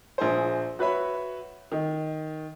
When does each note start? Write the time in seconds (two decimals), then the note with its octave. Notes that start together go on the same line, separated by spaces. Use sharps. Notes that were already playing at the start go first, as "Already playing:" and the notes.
0.18 A#1 G#4 C5
0.79 F#4 B4 C#5 E5 B5
1.72 D#3